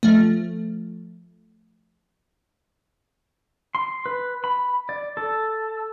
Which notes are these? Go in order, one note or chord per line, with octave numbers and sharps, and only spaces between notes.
F3 A3
C6
B4
B5
D5
A4